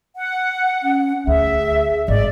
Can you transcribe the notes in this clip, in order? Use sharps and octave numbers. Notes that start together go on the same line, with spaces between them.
F#5
C#4
D2 G#4 E5
G#1 D5 D#5